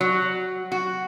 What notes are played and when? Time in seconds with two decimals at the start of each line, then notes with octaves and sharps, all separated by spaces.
0.01 F#3
0.72 F#4